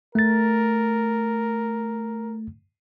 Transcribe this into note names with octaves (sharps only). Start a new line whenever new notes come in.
A3 A#4 A6